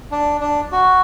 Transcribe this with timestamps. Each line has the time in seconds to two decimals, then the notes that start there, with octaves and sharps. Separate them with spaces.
0.12 D4
0.41 D4
0.72 F#4